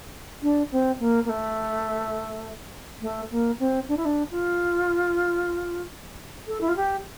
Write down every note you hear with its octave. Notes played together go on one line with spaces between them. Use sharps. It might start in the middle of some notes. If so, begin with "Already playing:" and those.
D4
C4
A#3
A#3
A3
A3
A#3
C4
D4
E4
D4
F4
A4
E4
F4
G4